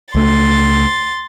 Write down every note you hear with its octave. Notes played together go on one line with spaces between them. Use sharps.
C#2 A3 C6 A6